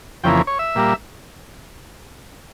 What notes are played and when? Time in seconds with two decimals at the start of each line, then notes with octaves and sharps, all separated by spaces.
0.24 F2 C#3 E3 A#3 G5
0.47 C#5
0.59 E5
0.75 A#2 G3 A#3